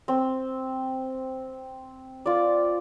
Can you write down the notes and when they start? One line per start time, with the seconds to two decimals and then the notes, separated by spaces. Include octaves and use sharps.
0.08 C4
2.26 F4 D5